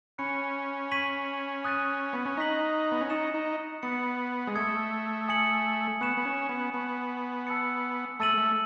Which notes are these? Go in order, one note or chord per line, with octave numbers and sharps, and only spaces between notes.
C#4 B5 F#6 C#7
C#6 G#6 B6 D#7 F#7
D#6 F#6 A6 D#7
B3
C#4
D#4 C#6 F#6 B6 F#7
B3
C#4
D#4 D#6 A6 C#7 E7
D#4
B3 D#6 A6 C#7
G#3
A3 D#6 G#6 C#7
G#5 D#6 G#6 C#7 F#7
B3 C#6 F#6 C#7 E7
B3
C#4
B3
B3 A5 C#6 G#6
A5 E6 A6 C#7
A3 A5 E6 A6 D#7 F#7
A3